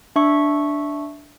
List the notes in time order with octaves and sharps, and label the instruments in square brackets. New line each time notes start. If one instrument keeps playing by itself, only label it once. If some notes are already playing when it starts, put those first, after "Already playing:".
[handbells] D4 E5 C#6